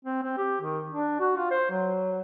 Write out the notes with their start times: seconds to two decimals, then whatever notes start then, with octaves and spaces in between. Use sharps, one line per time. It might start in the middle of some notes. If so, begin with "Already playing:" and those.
0.05 C4
0.23 C4
0.37 G4
0.61 D#3
0.91 D4
1.20 F#4
1.37 F4
1.51 C5
1.70 F#3